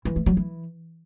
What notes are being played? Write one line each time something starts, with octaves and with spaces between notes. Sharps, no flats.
E3
A3
F#3
E3